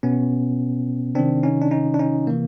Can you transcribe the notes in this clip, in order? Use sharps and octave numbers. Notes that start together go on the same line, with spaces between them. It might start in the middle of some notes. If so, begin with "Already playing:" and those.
B2 B3 C#4
C3 D#3 C4 D4
C#4 D#4
D4
C#4 D#4
D4
C#4 D#4
C3 E3 A#3